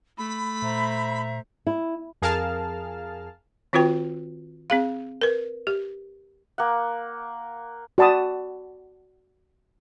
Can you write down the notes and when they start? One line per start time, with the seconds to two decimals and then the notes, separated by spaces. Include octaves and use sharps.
0.18 A3 B5
0.62 A#2 C5 E5 A#5
1.67 E4
2.22 F2 G#4 A#4 F5 A5 F6
3.73 D#3 C4 F4 F#4 B4 G5
4.70 C4 G#4 F5
5.21 A#4 B4
5.67 G4
6.58 A#3 F#5
7.98 F#4 D5 A5 B5 D#6